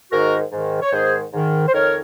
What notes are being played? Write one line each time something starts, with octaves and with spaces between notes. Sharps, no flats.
G#2 D#3 F#4 A#4
G#2 D#3
C#5
G#2 D#3 G#4 C5
G#2 D#3
C5
F2 D#3 A#4 C#5